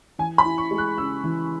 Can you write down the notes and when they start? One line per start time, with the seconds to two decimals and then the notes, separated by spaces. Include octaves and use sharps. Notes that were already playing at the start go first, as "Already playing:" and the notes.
0.19 E3 G#5
0.38 B5
0.45 E4
0.58 C#6
0.71 G#3
0.78 F#6
0.98 C#3 E6
1.24 E3